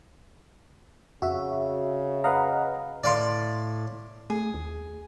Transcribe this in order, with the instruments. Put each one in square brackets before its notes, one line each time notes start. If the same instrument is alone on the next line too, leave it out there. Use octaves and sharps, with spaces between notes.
[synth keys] F2 [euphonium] C#3 [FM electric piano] F#4 E5
[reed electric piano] B4 F#5 A#5 [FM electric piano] D#5 F5
[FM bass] A2 [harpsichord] D5 F5 C6
[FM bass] A3 [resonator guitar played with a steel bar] G#4
[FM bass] D#2